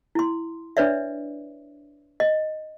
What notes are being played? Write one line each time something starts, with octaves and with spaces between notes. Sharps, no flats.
E4 C6
D4 B4 C#5 D5 E5
D#5